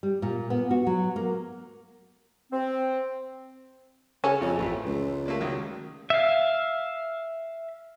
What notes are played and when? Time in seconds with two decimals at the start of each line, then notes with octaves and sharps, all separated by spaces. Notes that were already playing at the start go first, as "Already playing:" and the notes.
0.03 G3
0.22 A#2
0.50 B3
0.71 F#4
0.87 F#3
1.16 A#3
2.52 C4
4.24 C#3 C#4 A4
4.41 G#1 F2
4.59 A1 F2 A3
4.85 C#2
5.26 A3 A#3 D5
5.40 C#2 D#3 F#3
6.10 E5 F5